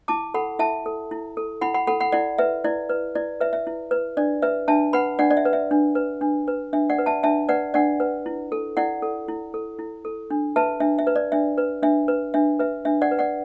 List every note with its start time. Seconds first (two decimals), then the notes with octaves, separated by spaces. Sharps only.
0.08 E4 A5 D6
0.34 A4 F#5 B5
0.59 E4 E5 A5
0.86 A4
1.11 E4
1.37 A4
1.61 E4 F#5 B5
1.74 F#5 B5
1.87 A4 F#5 B5
2.00 F#5 B5
2.12 E4 D5 F#5
2.38 B4 E5
2.64 E4 D5
2.89 B4
3.15 E4 D5
3.41 B4 E5
3.53 E5
3.67 E4
3.91 B4
4.17 D4 D5
4.42 B4 E5
4.68 D4 E5 A5
4.93 B4 F#5 B5
5.19 D4 D5 F#5
5.31 D5
5.37 E5
5.45 B4
5.53 E5
5.71 D4
5.95 B4
6.21 D4
6.48 B4
6.73 D4 E5
6.90 D5 F#5
6.98 B4
7.06 E5 A5
7.23 D4 E5 A5
7.49 B4 D5 F#5
7.74 D4 D5 F#5
8.00 B4
8.26 E4
8.52 A4
8.77 E4 D5 F#5
9.02 A4
9.28 E4
9.54 A4
9.79 E4
10.05 A4
10.30 D4
10.56 B4 E5 A5
10.80 D4 E5
10.99 E5
11.07 B4
11.16 D5
11.32 D4 E5
11.58 B4
11.83 D4 E5
12.08 B4
12.34 D4 E5
12.59 B4 E5
12.85 D4 E5
13.02 D5 F#5
13.11 B4
13.19 D5 F#5